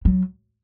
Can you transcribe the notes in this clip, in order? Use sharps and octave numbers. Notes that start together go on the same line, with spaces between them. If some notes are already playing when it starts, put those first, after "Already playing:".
F#3